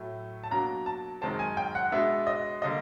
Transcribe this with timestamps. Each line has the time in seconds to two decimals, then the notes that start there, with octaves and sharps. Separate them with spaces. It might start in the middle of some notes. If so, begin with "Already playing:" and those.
Already playing: A2 F#3 A3
0.44 A5
0.51 B2 F#3 A#3 D4 A#5
0.86 A5
1.21 F#2 D#3 G#3 C4 A5
1.39 G#5
1.57 G5
1.75 F#5
1.92 B2 G#3 B3 D4 E5
2.27 D#5
2.62 D3 G3 A#3 D#5